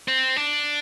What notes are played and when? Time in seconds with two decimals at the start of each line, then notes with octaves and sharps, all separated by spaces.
0.08 C4
0.36 D4